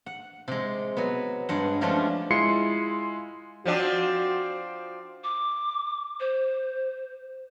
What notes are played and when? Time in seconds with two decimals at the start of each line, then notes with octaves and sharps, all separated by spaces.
0.06 F#5
0.48 C3 G#3
0.97 F#3 B3
1.49 G2 G#3 F#5
1.81 F3 G#3 A3 C#4 D4 F4
2.30 G#3 E4 F4 C6 C7 C#7
3.65 F3 C4 D4 F#4
5.24 D6
6.20 C5